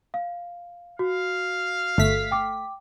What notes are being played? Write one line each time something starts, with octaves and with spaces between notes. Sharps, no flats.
F5
F#4 F5
G1 A3 B6
G5 D6